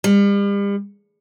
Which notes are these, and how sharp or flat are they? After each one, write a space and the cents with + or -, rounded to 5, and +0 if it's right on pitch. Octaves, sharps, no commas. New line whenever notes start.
G3 +40